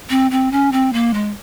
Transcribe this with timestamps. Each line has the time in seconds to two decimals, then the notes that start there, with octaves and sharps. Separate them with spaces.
0.10 C4
0.31 C4
0.52 C#4
0.72 C4
0.93 A#3
1.14 G#3